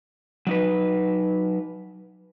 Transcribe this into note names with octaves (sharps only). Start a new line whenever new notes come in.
F#3 D#4 B4